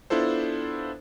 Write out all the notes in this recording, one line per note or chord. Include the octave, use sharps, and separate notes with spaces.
B3 D4 E4 F4 A4 C5